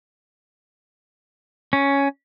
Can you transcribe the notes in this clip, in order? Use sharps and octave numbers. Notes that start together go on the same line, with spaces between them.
C#4